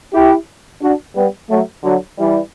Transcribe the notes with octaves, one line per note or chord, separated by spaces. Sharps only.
E4 G4
D4 F#4
G3 B3
F#3 A3
D3 F#3
E3 G3